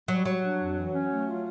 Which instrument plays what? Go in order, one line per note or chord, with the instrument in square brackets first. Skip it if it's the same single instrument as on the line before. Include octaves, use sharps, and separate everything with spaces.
[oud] F#3 [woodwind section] G3
[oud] F#3 [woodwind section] F#4
[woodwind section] D4
F2
E3
C#4
A3
F4